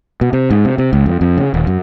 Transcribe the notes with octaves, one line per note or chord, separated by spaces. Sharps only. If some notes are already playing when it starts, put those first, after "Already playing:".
B2
C3
G#2
C3
C3
C#2
F2
F2
C#3
D#1
F#2